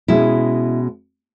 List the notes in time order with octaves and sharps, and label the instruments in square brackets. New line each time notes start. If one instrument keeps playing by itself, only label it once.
[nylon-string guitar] B2 G#3 C#4 E4